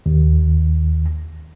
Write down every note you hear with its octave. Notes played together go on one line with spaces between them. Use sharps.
D#2